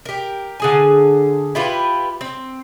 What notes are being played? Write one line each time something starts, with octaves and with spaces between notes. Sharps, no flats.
G4 A#4
D3 G#4 G#5
E4 F4 G4 B4
C4